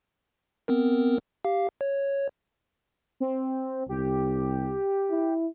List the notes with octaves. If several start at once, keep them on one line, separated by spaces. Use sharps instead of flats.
B3 C4 A#4
G4 F5
C#5
C4
C2 G4
E4